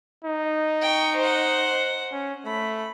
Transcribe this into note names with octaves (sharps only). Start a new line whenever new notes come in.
D#4
G5 C#6
C5 F#5
C#4
A3 B5